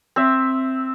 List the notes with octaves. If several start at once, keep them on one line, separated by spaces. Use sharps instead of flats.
C4 E5